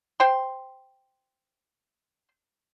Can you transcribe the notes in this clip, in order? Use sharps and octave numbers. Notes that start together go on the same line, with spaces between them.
C5 G5 C6